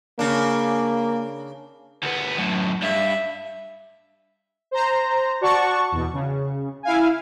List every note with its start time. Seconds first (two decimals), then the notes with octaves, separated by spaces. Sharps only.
0.19 C#3 A#3 D4
2.03 D2 B3
2.38 F#2 A2
2.82 G2 E5
4.71 C5 A#5
5.41 F#4 D5 F#5 A5 C#6
5.92 E2 B2
6.13 C#3
6.83 E4 F5 G#5